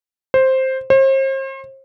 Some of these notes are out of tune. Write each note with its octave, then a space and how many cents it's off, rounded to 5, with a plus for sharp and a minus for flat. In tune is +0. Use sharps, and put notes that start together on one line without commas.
C5 +5
C5 +40